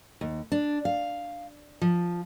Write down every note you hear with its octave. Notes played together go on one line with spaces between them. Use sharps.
D#2
D4
F5
F3